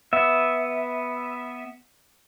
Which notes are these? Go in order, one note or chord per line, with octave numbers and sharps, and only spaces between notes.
B3 E5